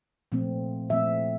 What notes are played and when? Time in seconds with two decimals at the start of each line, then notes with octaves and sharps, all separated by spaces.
0.32 A#2 F3 A3 C4
0.90 A#2 F3 A3 C4 E5